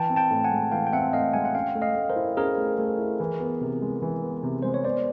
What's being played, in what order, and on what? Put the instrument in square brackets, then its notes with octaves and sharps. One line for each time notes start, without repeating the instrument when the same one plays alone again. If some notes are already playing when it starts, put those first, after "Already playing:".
Already playing: [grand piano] E3 [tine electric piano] G5 A5
[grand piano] C4
[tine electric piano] G5 A5
[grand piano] A2
[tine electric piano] F#5 G#5
[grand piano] G#3
[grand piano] E3 [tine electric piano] F5 G5
[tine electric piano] G5
[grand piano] C4 [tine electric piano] E5 F#5
[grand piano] A2 [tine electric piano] D#5 F5
[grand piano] G#3 [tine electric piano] F#5 G#5
[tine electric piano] F#5
[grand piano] C#4 [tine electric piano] F5 G5
[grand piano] A3
[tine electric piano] D#5 F5
[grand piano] A3
[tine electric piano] A#4 C5
[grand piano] E4
[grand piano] C#4 [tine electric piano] G#4 A#4
[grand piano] A3
A3
E4
E3
B3
C3
G#3
E3
B3
C3
[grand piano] G#3 [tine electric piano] C5
[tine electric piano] C#5
[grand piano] B3 [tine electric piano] C5 D5